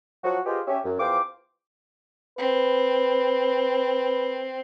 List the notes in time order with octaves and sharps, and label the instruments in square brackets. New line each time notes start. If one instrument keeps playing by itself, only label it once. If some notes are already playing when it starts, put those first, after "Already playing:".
[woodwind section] F3 F#3 F#4
F4 G4 G#4 B4 C5 D#5
C#4 G4 E5
F#2
E2 F3 C5 F5 G5 D6
[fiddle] C4 [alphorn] B4